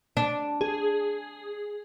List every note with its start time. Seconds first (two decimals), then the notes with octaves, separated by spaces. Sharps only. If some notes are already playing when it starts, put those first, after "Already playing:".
0.17 D4
0.61 G#4